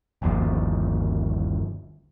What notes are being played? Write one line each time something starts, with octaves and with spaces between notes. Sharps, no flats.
G1 D#2 F3